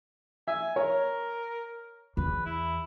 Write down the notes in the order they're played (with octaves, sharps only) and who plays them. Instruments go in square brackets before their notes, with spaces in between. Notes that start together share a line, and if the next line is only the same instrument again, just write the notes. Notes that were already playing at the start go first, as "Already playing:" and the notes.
[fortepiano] E5 [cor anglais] G#5
[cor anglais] A#4 [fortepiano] C#5
[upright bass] E2 [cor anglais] B4
[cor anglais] E4